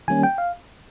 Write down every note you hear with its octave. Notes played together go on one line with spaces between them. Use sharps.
D#3 G3 A#3 C#4 G#5
G5
F5